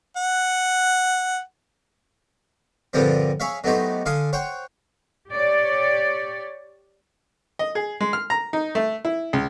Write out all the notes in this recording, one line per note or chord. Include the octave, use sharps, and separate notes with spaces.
F#5
G2 A#2 D3 F3 G3 C4
G#4 C#5 E5 F5
F#3 A3 B3 D#4 G4 C5
D3 F5 G#5 A5 C6 D#6
C5 C#5 F#5 G5
G4 C#5 D5
D#5
G#4
G#3
F6
A#5
D#4
A3
E4
C#2